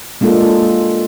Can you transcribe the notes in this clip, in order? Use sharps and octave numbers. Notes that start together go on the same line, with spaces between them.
G#3 A#3 D4 F4 A4